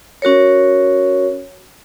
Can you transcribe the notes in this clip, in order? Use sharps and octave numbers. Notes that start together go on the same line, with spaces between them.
C#4 F#4 A#4 C#5